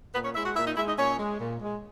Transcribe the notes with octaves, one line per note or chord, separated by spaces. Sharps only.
A#2 B3 B4
C#4 C#5
G#3 E4 E5
F#4 F#5
A#2 E4 E5
D#4 D#5
G#3 E4 E5
D#4 D#5
A#2 C#4 C#5
G#3
A#2
G#3